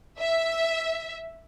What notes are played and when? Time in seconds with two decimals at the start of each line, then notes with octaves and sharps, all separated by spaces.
0.20 E5